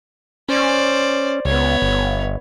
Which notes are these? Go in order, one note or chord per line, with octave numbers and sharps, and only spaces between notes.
C#4 C5 D5
C#2 B3 C#5
G1